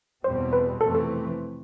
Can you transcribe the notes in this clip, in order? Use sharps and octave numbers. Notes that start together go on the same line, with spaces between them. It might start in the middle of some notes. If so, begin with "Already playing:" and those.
E2 B2 G3 C4 C5
B4
F2 C3 E3 A3 C4 A4
A4